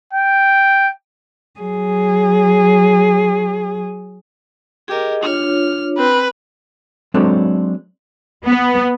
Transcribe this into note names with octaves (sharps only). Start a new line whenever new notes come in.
G5
F#3 G#4
G4 G#4 A#4 D#5
D4 F4 C#5 F6
C4 B4
F#3 G#3 C4 D4 A4 C#5
B3